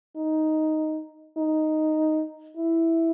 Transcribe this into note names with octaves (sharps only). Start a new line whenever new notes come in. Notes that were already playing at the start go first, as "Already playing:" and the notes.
D#4
D#4
E4